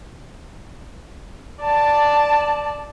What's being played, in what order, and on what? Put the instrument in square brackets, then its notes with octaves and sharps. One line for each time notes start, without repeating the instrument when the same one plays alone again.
[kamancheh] D5 A5